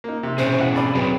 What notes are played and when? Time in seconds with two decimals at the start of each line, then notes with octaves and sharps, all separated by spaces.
0.04 A#3 D#4
0.23 C3
0.38 B2 C#4 G#4 C5
0.58 E3 E5 F#5
0.75 G#1 D5 B5
0.95 F#3 C4 G#4 B4 G5